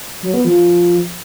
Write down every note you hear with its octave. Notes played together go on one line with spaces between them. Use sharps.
F#3
B3
F3